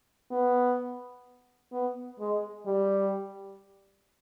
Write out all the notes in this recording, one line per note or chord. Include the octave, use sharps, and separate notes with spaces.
B3
B3
G#3
G3